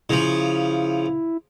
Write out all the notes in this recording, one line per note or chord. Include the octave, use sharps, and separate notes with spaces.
C#3 F3 E4